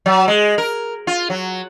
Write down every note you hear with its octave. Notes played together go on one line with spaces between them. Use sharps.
F#3
G#3
A#4
F4
F#3